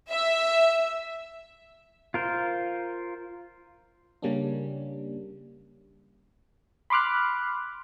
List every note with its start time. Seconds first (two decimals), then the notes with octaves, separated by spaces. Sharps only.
0.10 E5
2.14 F4 A#4 C5
4.22 C#3 G3 A#3 C#4 D4
6.90 B5 C6 D6 F6 F#6